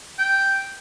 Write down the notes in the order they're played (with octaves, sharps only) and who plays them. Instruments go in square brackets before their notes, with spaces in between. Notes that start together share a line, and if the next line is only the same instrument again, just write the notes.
[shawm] G5